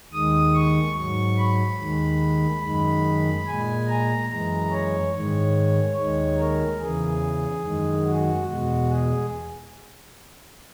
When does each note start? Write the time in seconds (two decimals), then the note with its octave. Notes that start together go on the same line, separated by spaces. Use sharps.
0.12 D#2 D#3 G#3 D#6
0.54 C#6
0.96 G#2 F#3 C#6
1.37 B5
1.79 D#2 D#3 G#3
2.63 F#2 D#3 G#3 B5
3.46 A#2 G#3 G#5
3.88 A#5
4.30 F#2 E3 G#3 A#5
4.71 C#5
5.13 G#2 D#3 G#3 C#5
5.96 D#2 D#3 G#3 C#5
6.38 A#4
6.80 E2 C#3 E3 G#4
7.63 F#2 D#3 G#3
8.05 F#4
8.47 E2 B2 G#3 F#4
8.89 G#4